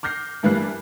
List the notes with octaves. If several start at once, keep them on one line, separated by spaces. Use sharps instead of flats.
D6 F6 G6 A#6 C7
G2 E3 G3 A#3 F#6 C7